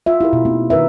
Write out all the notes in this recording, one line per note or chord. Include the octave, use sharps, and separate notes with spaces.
F4 E5
E4 G4 A#4
B2
A#3 C4 D#4
D#3 D4 A#4 B4 E5